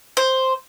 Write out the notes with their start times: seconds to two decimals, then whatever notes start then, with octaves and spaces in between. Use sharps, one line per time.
0.17 C5